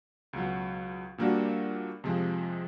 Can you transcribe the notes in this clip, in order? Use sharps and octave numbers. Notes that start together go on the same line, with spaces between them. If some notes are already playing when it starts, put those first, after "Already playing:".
C#2 B2 F#3
A#2 G3 A#3 D4 F#4
F2 C3 F3 G#3